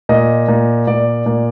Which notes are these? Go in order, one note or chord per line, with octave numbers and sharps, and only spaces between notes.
A#2 D#5
A#2
A#2 D5
A#2